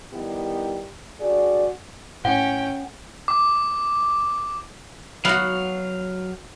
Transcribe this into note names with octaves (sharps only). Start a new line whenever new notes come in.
D#3 G3 B3 E4 G4
G2 F#4 G#4 D5
A2 C#4 F#5 G5
D6
F#3 B3 F#4 F5